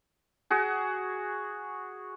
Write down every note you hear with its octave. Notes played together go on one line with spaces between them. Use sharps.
F#4 G#4